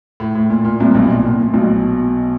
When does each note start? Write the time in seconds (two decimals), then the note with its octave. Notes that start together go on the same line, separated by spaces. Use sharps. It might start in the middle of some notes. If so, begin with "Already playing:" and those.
0.20 A2
0.35 A2
0.50 A#2
0.65 A#2
0.80 C2 C3
0.94 B1 B2
1.03 A2
1.09 A#2
1.24 A2
1.39 A#2
1.54 B1 B2